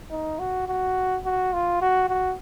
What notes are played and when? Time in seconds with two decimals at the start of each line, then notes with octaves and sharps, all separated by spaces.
0.11 D#4
0.39 F#4
0.67 F#4
1.25 F#4
1.53 F4
1.81 F#4
2.09 F#4